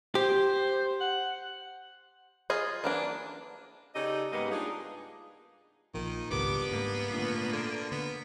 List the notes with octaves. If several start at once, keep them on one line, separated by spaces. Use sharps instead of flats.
G4 C5
F#5
F4 G#4 D#5
E3 A#3 D4
C#3 D#4 G4 A4 D5 D#5
G#2 G3 G#3 A#3 B3 D#5
D4 D#4 F4 G#4
A#1 D#3 F3 A#3 F4
G#1 C#2 G2 B3 D6
G#2 A#3
A#2 D3 A3
D3 F6 G#6 D7
D3 B3